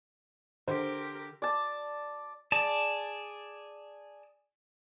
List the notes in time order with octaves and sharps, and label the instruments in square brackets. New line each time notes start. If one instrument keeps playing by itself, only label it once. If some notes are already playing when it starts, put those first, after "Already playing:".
[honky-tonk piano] D3 [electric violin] G4 A#4 [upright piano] C5
[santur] D5 A5
[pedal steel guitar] G#4 D5 A5